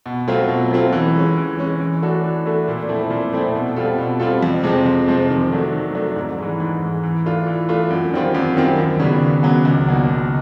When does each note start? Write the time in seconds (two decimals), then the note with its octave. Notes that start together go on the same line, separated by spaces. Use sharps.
0.06 B2
0.28 F#3 A3 C4 F4
0.49 B2
0.71 F#3 A3 C4 F4
0.92 E3
1.15 G#3 C#4
1.37 E3
1.59 G#3 C#4
1.80 E3
2.02 A3 D4 F#4 A4
2.24 E3
2.45 A3 D4 F#4 A4
2.68 A#2
2.89 F3 A3 C4 E4
3.10 A#2
3.33 F3 A3 C4 E4
3.55 B2
3.76 G3 C4 F4 A4
3.98 B2
4.20 G3 C4 F4 A4
4.43 F2
4.63 C3 F3 G#3 C4
4.86 F2
5.08 C3 F3 G#3 C4
5.29 D#3
5.52 F#3 A3 D4
5.73 D#3
5.95 F#3 A3 D4
6.16 G#2
6.38 E3 G#3
6.60 G#2
6.82 E3 G#3
7.03 E3
7.26 A3 D4 F4
7.47 E3
7.69 A3 D4 F4
7.90 F#2
8.13 D#3 G3 C4 F4
8.35 F#2
8.57 D#3 G3 C4 F4
8.78 D#2
9.00 C#3 F#3 B3 D4
9.21 D#2
9.43 C#3 F#3 B3 D4
9.65 C#2
9.87 B2 F#3 A#3 D#4
10.09 C#2